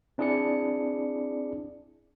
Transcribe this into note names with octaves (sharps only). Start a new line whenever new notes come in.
C4 D4 E4 G#4 D5 C#7